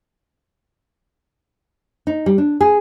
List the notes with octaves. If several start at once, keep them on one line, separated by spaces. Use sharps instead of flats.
D#4
G3
D4
G#4